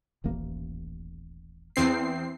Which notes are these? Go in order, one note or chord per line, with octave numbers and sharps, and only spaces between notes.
D#1 A1 A#3
E2 C4 C7